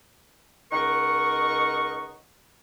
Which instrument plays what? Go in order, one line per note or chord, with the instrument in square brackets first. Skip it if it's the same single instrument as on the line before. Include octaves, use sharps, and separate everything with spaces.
[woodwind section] C#2 D#4 A#4 F#5 C#6